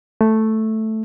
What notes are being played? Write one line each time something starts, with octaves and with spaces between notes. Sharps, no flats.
A3